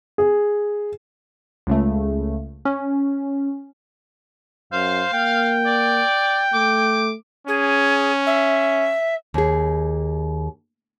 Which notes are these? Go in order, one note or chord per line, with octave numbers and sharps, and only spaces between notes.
G#4
C#2 C#3 A3
C#4
F#2 C5 F5
A#3 G5
D5
A3 D6
C#4 G#4
E5
D#2 G#4